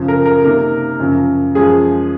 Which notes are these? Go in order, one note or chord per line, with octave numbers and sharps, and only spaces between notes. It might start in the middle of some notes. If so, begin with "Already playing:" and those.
Already playing: F#2 C#3 F3
A#4
A#4
C3 D#3 A#3 A#4
F#2 C#3 F3
F#2 F3 G#3 G#4